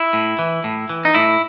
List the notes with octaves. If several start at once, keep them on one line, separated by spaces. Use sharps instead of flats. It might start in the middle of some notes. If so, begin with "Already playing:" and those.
Already playing: E4
A2
E3
A2
E3
D#4
A2 E4